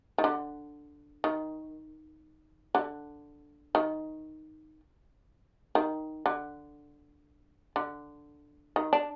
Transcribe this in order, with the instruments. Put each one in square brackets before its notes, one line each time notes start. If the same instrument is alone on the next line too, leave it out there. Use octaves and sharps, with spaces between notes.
[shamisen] D#3
D3
D#3
D3
D#3
D#3
D3
D3
D#3
D4